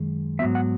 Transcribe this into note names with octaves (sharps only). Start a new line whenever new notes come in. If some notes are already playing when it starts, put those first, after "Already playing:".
Already playing: F#2 D#3 G#3
G#2 F#3 B3 E5
F#5